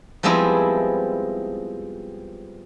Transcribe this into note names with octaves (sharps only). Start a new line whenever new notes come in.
F3 G3 G#3 B3 C4 E4